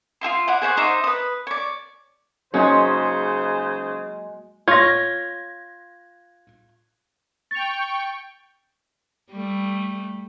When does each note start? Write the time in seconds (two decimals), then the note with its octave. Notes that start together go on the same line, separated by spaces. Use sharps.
0.21 F4 G#4 E5 C6
0.48 E4 D5 F#5
0.62 G#4 C5 F#5 C#6
0.77 D#4 C5 E5 D6
1.04 B4 D#6
1.47 C#5 D5
2.54 C#3 F#3 G#3 A#3 C#4 D#4 F#4 C5
4.68 F4 C#5 G#6 A#6
7.51 G5 C#6 A6 F7
9.32 G3 A3